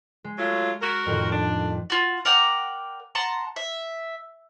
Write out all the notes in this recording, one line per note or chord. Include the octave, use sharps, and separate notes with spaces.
G#3
F#3 A3 F4
F#4 A#4 A#5 B6
F2 A2 D#3
D4
F4 F#4
A#4 D5 F#5 G5
F#5 A5 A#5 C6
E5